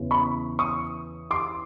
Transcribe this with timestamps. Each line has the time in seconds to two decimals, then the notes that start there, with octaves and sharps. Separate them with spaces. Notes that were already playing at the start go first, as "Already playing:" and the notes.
Already playing: E2 C#3 E3
0.11 B5 C#6
0.59 C#6 D#6
1.31 C6 D6